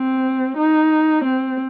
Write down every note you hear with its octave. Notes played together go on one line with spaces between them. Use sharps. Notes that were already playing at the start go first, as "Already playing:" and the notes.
Already playing: C4
D#4
C4